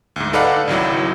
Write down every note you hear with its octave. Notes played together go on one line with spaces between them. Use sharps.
D2 G#2
D#4 A4 B4 D5 F5 F#5
G#1 C#2 F#3 E4